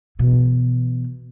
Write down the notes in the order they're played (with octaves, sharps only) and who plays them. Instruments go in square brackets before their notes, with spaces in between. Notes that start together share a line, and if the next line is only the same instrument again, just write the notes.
[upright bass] B2 E3